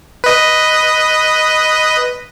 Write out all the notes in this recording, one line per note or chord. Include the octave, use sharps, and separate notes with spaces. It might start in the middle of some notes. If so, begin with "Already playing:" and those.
B4 D#5